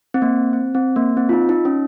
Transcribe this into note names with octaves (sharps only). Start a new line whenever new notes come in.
C4
A#3
C4
C4
A#3
C4
F4
D#4
D#4
C#4